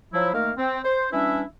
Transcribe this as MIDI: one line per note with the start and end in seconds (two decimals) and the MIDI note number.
0.13 0.32 53
0.13 0.32 54
0.13 0.32 64
0.33 0.51 51
0.33 0.51 57
0.33 0.51 58
0.33 0.51 70
0.33 0.51 77
0.57 0.78 60
0.84 1.06 72
1.12 1.42 52
1.12 1.42 55
1.12 1.42 61
1.12 1.42 62
1.12 1.42 64
1.12 1.42 76